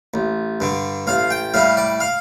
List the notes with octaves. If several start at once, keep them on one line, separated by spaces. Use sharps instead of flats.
A1
G2 D3
A1 F5
G5
A2 G3 F5
D5
F5